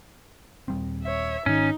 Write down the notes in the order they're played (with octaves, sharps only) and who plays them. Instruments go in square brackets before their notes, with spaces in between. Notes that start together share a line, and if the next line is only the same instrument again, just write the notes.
[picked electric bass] D#1 G3 C4
[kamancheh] C#5 E5
[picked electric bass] G#2 D#3 [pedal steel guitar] C#4 [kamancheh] D#4